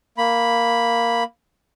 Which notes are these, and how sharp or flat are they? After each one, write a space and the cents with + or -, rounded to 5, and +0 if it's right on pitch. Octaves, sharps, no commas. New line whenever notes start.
A#3 +0 B5 +0